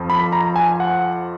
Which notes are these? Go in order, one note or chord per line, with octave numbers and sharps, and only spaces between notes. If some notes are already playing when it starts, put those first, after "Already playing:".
Already playing: F2 F3
B5
A#5
G#5
F#5